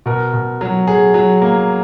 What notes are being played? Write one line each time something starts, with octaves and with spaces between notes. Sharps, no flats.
B2 A#4
B2
F#3
F#3 G#4
F#3
A#3